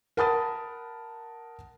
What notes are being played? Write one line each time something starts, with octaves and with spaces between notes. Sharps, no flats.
A#4 F#5 A5 B5 D#6 A6